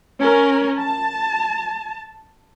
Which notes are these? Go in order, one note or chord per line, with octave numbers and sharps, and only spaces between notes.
C#4 A#4
A5